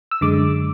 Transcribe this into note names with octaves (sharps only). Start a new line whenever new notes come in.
E6
F#2 D3 G#3 D6